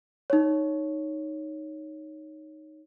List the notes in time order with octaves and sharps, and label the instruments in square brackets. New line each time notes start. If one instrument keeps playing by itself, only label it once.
[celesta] D#4 C#5